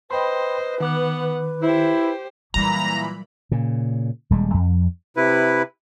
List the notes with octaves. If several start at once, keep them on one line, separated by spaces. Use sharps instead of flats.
B4 C5 D#5 G5 B5 C6
D#3 B3 F#5 D6 F#6
E4 G4 C5
A#2 E3 F#3 G3 A#5 B5
A#2 C#3
D#1 G3 G#3
F2
C3 E4 B4